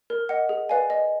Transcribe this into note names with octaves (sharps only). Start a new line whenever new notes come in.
A#4
D#5 F#5
G#4
B4 D5 F5 G#5
D#5